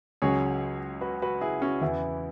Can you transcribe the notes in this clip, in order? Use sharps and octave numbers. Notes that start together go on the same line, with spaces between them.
C#2 C#3 F#3 G#4 C#5
F#4 B4
F#4 B4
E4 G#4
C#4 F#4
E2 C#3 E3 B3 E4